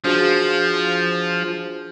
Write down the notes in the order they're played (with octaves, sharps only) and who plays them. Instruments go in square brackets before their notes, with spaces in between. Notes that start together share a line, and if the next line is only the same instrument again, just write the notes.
[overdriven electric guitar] F3 [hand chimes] D4 F#4 G#4